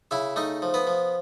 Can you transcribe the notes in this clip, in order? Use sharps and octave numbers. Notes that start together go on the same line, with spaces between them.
C#3 E4 E5
A3 D#4 D#5
F3
B3 B4
F3